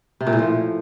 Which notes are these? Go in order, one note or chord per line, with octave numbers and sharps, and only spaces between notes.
C3
A#2
A2
F3